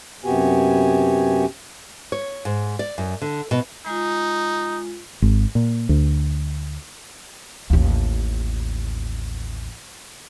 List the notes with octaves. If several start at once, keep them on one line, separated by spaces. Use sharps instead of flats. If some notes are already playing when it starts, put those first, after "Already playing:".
F#2 C3 B3 F#4 G4 G#5
C#5
G#2
D5
F#2
D3
B2
G#3 D#4 F4
G#1
A#2
D2
A1 D#2